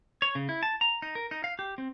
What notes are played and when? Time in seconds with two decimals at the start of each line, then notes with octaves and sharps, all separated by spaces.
0.22 C#5
0.35 C#3
0.49 E4
0.63 A5
0.81 A#5
1.02 D#4
1.15 A#4
1.31 D#4
1.44 F5
1.59 G4
1.78 C4